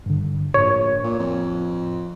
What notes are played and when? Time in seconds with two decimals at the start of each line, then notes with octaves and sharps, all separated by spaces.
0.06 G2 D3
0.54 A#1 A2 C#5
1.04 A#2
1.19 F2